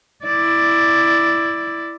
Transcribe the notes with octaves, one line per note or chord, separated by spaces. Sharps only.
E4 D5